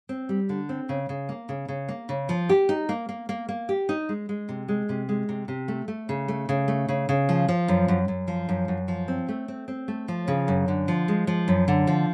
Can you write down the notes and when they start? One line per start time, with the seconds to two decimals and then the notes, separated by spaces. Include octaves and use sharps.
0.09 C4
0.29 G3
0.49 D3
0.69 C4
0.89 C#3
1.09 C#3
1.29 A#3
1.49 C#3
1.69 C#3
1.89 A#3
2.09 C#3
2.29 F3
2.49 G4
2.69 D#4
2.89 A#3
3.09 A#3
3.29 A#3
3.49 A#3
3.69 G4
3.89 D#4
4.09 G#3
4.29 G#3
4.49 C3
4.68 G#3
4.89 C3
5.09 G#3
5.29 C3
5.48 C3
5.68 A3
5.88 A3
6.09 C#3
6.28 A3
6.49 C#3
6.68 A3
6.89 C#3
7.09 C#3
7.29 F3
7.49 F3
7.68 F#2
7.88 F#2
8.08 F#2
8.28 F3
8.49 F#2
8.68 F#2
8.88 F3
9.08 C4
9.29 A3
9.48 C4
9.68 C4
9.88 A3
10.08 F3
10.28 C#3
10.48 F#2
10.68 D3
10.88 F3
11.08 G#3
11.27 F3
11.48 F#2
11.68 D3
11.87 F3